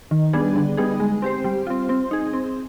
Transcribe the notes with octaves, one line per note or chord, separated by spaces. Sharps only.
D#3
G3 B3 D4 G#4
D3
G3 B3 D#4 G#4
G#3
C4 G4 C5
G3
C4 F4
C4
D#4 G#4
C4